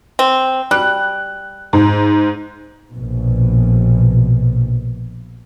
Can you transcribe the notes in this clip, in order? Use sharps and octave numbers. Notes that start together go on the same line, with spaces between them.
C4
G3 F#6
G#2
A#1 B2